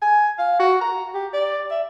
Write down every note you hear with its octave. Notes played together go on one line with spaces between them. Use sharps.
G#5
F5
F#4
A#5
G4
D5
E5